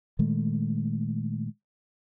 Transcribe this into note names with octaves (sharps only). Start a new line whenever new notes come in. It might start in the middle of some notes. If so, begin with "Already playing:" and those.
A#2 D#3 G#3 A3